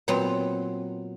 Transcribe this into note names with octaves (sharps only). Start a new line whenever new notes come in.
A#2 F#3 B3 C4 B4